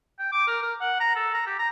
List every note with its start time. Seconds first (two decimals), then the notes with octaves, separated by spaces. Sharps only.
0.19 G5
0.32 D6
0.47 A#4
0.62 A#4
0.81 F#5
1.00 A#5
1.15 A4
1.34 A#5
1.47 G4
1.59 A#5